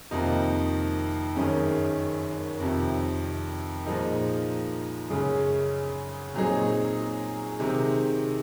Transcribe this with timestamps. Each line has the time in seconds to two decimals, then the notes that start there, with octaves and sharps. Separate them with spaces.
0.11 F2 C3 D#3 A#3 D#4
1.36 G#1 F#2 D#3 G#3 C#4
2.60 F2 C3 D#3
3.86 A#2 F3 G#3 D#4 A#4
5.10 F#2 C#3 G#3 C#4 G#4
6.34 A#2 F#3 C4 D#4 G#4
7.59 C3 D#3 G#3